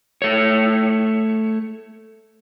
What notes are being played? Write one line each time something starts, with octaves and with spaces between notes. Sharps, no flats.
A3 C#5